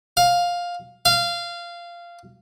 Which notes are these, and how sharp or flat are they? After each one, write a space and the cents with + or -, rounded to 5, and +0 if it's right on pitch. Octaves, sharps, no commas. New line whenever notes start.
F5 +10
F5 -15